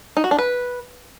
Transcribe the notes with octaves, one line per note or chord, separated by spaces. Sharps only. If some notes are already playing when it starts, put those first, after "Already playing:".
D#4
F#4
D4
B4